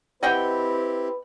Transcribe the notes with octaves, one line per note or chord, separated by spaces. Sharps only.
C4 E4 G4 B4 D#5 F#5 G5